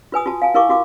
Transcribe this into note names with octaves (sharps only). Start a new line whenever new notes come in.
F4 B4 G#5 D#6
F4 F#4 A5
F5 G#5 A5
E4 A#4 F5 C#6 D6
E4 F#4 F5 D6